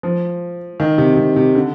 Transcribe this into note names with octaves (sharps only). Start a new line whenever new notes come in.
F3
D#3
C3
C3
C3
D3